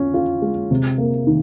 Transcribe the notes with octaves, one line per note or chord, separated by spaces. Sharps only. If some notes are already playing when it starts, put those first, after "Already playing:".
Already playing: C#4 F4
F4
G#3
C3
A#3
D#3